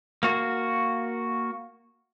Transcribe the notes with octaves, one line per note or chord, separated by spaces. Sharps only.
A#3 F#4